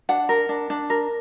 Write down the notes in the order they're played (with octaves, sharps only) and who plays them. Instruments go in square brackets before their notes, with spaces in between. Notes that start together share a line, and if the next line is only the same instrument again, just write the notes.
[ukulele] D4 F#5
A#4
D4
D4
A#4